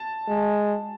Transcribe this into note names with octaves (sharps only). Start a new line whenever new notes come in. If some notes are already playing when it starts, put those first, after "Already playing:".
Already playing: A5
G#3